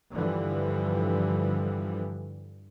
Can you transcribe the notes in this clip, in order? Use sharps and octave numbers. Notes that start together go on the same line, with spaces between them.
G2 D3 E3 F3 G3